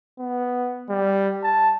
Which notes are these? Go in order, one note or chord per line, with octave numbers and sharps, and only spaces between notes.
B3
G3
A5